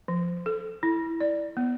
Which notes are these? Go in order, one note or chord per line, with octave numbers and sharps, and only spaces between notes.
F3
A4
E4
D5
B3